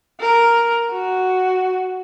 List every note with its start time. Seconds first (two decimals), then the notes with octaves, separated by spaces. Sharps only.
0.20 A#4
0.91 F#4